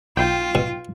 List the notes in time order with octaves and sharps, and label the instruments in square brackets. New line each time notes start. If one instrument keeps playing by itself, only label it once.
[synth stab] B1 G5 [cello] F4
[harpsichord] B2